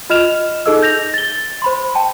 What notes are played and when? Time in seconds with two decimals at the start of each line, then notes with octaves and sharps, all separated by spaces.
0.10 F4 D#5 F6 E7 F7
0.66 D#4 G#4 A4 D#5 E6
0.82 G6 A#6 F7
1.14 A6 G7
1.62 C5 B5 C6
1.95 G5 A5